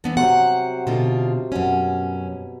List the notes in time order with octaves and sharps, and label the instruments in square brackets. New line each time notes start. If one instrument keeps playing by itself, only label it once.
[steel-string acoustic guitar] E3 B3 D4
[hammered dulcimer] C3 F#3 C5 [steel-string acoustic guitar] F#5
[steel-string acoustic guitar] B2 D3 F4
[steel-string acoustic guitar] F#2 C#4 [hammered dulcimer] B2